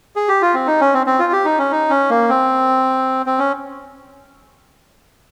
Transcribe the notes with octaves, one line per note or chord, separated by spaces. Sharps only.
G#4
G4
F4
C4
D#4
C#4
C4
C4
F4
G4
D#4
C#4
D#4
C#4
A#3
C4
C4
C#4